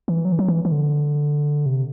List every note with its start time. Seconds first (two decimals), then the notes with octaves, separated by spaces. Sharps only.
0.08 E3
0.25 F#3
0.32 E3
0.39 F#3
0.48 E3
0.65 E3
0.72 D3
1.66 C3